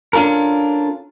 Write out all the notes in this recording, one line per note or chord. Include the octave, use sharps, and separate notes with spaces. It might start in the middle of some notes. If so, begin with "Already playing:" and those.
C#4 D4 F4 A4 A#4